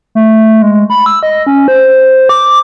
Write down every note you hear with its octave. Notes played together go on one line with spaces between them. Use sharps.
A3
G#3
B5
E6
D#5
C#4
C5
D6